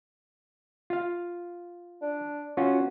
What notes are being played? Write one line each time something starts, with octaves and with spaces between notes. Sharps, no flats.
F4 F5
D4
C#4 F4 F#4